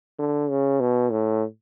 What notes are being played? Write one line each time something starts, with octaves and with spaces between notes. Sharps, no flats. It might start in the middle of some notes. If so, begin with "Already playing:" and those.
D3
C#3
B2
A2